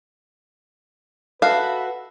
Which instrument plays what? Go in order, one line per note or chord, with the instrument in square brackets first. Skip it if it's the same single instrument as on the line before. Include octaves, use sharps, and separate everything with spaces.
[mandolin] F#4 A4 E5 [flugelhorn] B4 [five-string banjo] F5